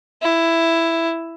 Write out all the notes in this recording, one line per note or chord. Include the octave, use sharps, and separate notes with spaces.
E4